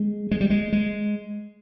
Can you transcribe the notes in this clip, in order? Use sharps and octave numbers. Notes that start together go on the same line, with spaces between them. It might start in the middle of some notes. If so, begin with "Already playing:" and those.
Already playing: G#3
G#3
G3
G#3
G#3